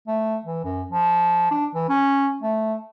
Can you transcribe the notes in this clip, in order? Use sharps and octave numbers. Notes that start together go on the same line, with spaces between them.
A3
E3
F#2
F3
D4
E3
C#4
A3